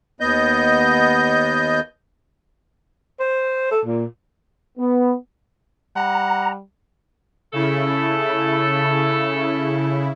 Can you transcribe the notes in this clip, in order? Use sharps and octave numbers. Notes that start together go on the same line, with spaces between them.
D#2 B3 D#5 G6
C5
A4
A#2
B3
G3 F#5 A#5
C#3 A3 E4 A4